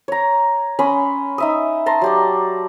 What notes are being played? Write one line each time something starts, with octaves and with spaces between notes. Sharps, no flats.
C#5 A#5
C#4 B5 C6 D#6
D#4 E5 D#6
A5 A#5 C6
F#3 G4 D5